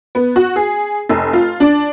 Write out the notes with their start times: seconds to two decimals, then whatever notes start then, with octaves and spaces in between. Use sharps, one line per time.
0.15 B3
0.36 F#4
0.56 G#4
1.09 F1
1.33 F4
1.60 D4